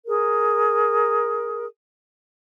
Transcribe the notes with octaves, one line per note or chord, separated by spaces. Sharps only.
G#4 A#4